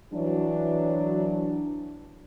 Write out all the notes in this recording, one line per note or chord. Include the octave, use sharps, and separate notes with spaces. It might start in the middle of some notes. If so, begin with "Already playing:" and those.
E3 F#3 D4